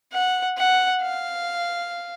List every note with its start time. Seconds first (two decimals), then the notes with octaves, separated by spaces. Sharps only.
0.13 F#5
0.57 F#5
1.02 F5